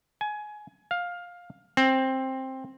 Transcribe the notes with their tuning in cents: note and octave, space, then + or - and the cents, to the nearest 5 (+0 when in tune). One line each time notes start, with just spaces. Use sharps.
G#5 +20
F5 +15
C4 +10